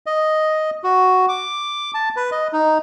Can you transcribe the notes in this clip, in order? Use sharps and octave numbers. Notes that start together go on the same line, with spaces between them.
D#5
F#4
D6
A5
B4
D#5
D#4